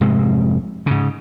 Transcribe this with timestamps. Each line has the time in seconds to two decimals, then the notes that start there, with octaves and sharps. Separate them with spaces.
0.01 F1 G#2 C3 G#3
0.86 G#2 C#3